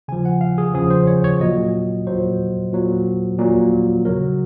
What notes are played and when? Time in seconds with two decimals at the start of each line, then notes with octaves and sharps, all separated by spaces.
0.08 C#3 F3 G#5
0.25 F#5
0.41 F5
0.58 G#4
0.74 C#3 F3 G#4
0.91 C5
1.07 C#5
1.24 C#5
1.41 A#2 F#3 D#5
2.07 A#2 F#3 C5
2.73 A#2 F#3
3.39 A#2 F#3
4.05 C#3 F#3 A#4